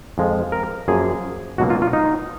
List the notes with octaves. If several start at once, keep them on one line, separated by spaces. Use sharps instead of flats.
F2 F3 G#3
A#4
F#2 F3 A#3 G#4
C#2 B2 F#3 A#3 F#4
F4
F4
D#4